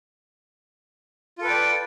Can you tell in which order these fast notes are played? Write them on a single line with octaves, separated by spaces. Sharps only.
F4 A4 B4 G5 D5